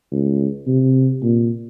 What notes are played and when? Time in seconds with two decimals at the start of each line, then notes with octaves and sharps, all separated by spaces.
0.12 C#2
0.67 C3
1.23 A#2